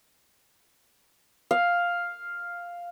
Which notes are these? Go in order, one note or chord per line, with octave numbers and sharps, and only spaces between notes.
F5